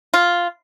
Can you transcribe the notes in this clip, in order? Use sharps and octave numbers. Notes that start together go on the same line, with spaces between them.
F4